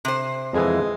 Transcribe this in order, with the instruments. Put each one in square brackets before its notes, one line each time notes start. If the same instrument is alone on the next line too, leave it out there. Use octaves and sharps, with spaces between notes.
[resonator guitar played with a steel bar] C3 C5
[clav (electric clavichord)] F2 E3 [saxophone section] G#3